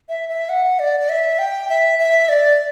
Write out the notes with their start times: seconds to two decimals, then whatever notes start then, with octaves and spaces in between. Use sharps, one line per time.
0.09 E5
0.29 E5
0.49 F#5
0.79 D5
1.00 D5
1.09 E5
1.39 G5
1.69 E5
1.99 E5
2.29 D5